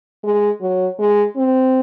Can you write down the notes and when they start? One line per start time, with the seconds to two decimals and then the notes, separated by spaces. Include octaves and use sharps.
0.24 G#3
0.61 F#3
0.99 G#3
1.36 C4